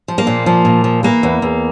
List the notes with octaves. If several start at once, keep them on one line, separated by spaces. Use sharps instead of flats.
F3
A#3
A#2
F3
A#2
F3
E3 A#3
E2
E2